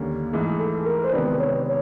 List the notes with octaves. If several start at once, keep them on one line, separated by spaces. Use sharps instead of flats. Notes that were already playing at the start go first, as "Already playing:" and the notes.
Already playing: D#2 D3 G3 A#3 C#4
G#2 E3 A3 G#4
A4
A#4
C5
C3 D#3 G#3 B3 D4 B4
C#5
C#5